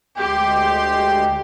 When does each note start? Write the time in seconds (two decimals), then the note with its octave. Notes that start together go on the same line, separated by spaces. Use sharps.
0.18 D2 G#3 G4 G5 C6